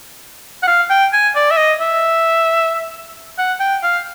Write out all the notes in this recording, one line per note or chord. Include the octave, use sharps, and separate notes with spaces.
F#5
F5
G5
G#5
D5
E5
D#5
E5
F#5
G5
F5